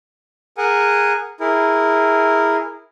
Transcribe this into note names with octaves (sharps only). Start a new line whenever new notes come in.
G#4 A#4 F#5 G#5
E4 G#4 A#4